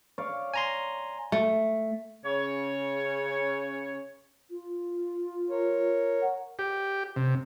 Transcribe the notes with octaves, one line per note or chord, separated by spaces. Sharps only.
C#5 D5 F5
G#5 A#5 C6
A3
C#3 C#5
F4
A#4 C#5
F#5
G4
C3